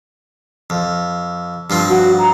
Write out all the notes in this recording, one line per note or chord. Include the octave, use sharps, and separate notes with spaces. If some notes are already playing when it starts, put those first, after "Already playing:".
F2
G2 F3 C4
F#4
A#5